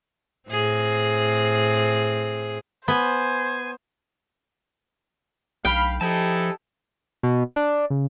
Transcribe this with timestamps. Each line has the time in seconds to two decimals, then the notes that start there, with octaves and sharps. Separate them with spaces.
0.49 A2 C4 G#4
2.88 B3 C5 G#5
5.65 B1 F5 G5 B5
6.01 F3 D#4 E4 G4 A4 G#5 A5
7.23 B2
7.56 D4
7.90 C#2